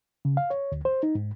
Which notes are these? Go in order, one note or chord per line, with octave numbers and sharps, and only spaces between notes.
C#3
F5
C#5
D2
C5
D#4
G#2